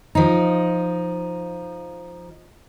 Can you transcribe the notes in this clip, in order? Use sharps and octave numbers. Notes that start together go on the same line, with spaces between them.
F3 D#4